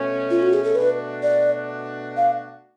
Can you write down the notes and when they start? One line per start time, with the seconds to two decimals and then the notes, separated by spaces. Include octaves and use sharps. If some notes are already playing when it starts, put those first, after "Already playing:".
Already playing: B2 A3 C#4
0.31 F4
0.42 F#4
0.53 G#4
0.64 A4
0.75 B2 A3 D4 F#4 B4
1.23 D5
2.17 F5